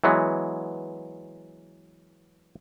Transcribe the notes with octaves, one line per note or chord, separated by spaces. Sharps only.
E3 F#3 G#3 B3